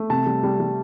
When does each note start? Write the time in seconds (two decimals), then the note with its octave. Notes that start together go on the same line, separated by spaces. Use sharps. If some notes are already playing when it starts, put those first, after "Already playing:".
Already playing: A3
0.10 C3 A5
0.26 G3
0.43 G3
0.60 G3